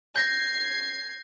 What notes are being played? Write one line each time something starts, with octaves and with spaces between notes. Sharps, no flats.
G6 G#6 A#6 C7